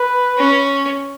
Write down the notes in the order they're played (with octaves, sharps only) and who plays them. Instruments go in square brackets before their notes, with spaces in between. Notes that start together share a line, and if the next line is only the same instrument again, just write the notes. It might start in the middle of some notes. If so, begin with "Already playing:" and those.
Already playing: [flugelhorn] B4
[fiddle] C#4